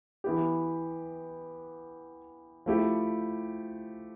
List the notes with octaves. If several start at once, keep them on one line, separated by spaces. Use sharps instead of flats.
E3 B3 E4 G4
F3 A3 E4 G4